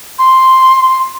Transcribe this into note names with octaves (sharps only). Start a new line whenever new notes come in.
C6